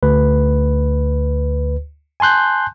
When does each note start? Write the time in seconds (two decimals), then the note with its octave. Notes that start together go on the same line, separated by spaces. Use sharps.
0.03 D2 B4
2.20 G#5 A5 C6 F#6 G6